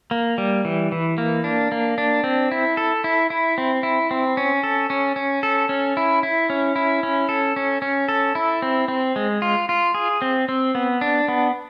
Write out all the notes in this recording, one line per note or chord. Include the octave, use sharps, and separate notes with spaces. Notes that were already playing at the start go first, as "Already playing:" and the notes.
A#3
G3
E3
E3
A#3
D4
A#3
D4
C4
E4
A4
E4
E4
C4
E4
C4
C#4
A4
C#4
C#4
A4
C#4
E4
E4
C#4
E4
C#4
A4
C#4
C#4
A4
E4
C4
C4
G#3
F4
F4
G#4
C4
C4
B3
D4
B3